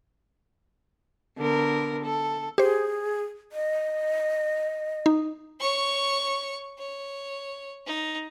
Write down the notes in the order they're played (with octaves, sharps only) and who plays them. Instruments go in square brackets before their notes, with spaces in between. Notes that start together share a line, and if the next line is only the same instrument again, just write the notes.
[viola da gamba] D3 B3 A#4
A4
[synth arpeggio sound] G4 C5 [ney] G#4
[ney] D#5
[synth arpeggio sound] D#4
[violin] C#5 C#6
C#5
D#4